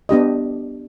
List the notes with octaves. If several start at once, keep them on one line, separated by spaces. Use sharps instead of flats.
B3 D4 G4 D#5